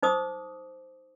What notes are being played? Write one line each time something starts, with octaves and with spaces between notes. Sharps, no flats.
D#4 C5 D6 D#6